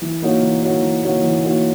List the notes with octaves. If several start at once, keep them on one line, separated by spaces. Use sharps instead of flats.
E3
A#3 D#4 F#4 C#5
E3
A#3 D#4 F#4 C#5
E3
A#3 D#4 F#4 C#5
E3
A#3 D#4 F#4 C#5